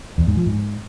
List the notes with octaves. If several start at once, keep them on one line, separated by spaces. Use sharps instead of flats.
E2
G#2
F3
G#2